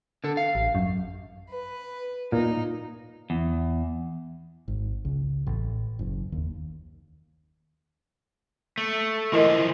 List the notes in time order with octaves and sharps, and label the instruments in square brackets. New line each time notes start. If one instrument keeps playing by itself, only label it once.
[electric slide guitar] D3 A4
F5
[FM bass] A1
F#2
[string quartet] B4
[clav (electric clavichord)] A#2 [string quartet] D#4
[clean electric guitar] E2
[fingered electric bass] G#1
C#2
A1
F#1
D#2
[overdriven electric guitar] A3
[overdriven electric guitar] E3 F3 [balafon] E4 A#4 D#5